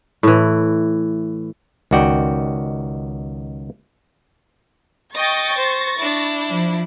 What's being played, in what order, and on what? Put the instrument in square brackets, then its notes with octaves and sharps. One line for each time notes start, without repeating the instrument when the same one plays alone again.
[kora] A2 E3
[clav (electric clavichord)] C#2 D#3 F#4 D5 G5
[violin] D#5 G5 [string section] C#6 A6 A#6
[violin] C5
D4 E4
[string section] F3